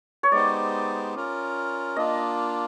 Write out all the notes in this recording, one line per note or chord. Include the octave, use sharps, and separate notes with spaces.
C#5
G#3 B3 D#4 G4 C5 D5
C#4 F4 A#4
A#3 D4 F4 D#5